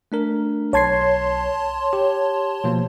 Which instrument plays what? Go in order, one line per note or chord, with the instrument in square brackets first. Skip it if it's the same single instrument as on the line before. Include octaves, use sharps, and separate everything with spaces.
[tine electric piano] A3 D4 A#4
[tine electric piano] B1 G#6 C7 [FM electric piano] C#5 A5 C6
[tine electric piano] G4
B2 F3 A#3